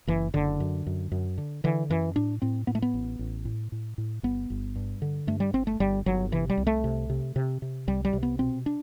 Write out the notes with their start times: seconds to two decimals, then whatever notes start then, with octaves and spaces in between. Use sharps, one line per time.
0.07 F#1 E3
0.34 F#1 D3
0.60 F#2
0.87 F#2
1.12 F#2
1.38 D3
1.64 D3 E3
1.90 F#2 E3
2.16 A2 D4
2.42 A2 C4
2.67 A2 B3
2.75 A3
2.82 B3
2.94 A1
3.19 A1
3.45 A2
3.72 A2
3.98 A2
4.23 G1 B3
4.50 G1
4.76 G2
5.02 D3
5.27 G2 A3
5.40 G3
5.53 G1 C4
5.67 A3
5.80 G1 G3
6.06 G1 F#3
6.32 C3 E3
6.50 G3
6.57 C2
6.67 A3
6.84 C3
7.10 C3
7.36 C3
7.62 C3
7.87 C2 G3
8.05 G3
8.13 C3
8.23 B3
8.39 B2 C4
8.66 D4